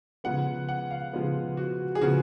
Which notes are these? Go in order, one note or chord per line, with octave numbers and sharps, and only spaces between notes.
C#3 F3 G#3 B3 F#5
F#5
F5
C#3 F3 G#3 B3
F#4
G#4
C#3 F3 B3 F#4